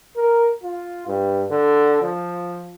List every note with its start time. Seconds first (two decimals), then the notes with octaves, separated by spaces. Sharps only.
0.16 A#4
0.63 F4
1.07 G2
1.51 D3
2.02 F3